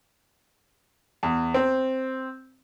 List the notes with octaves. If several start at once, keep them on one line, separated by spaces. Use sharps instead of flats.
E2
C4